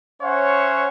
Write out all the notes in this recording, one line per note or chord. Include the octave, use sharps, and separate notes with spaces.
C#4 C5 C#5 E5 F#5